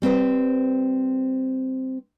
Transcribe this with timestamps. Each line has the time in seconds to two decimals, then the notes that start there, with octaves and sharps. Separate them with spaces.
0.02 G3 C4 B4 C5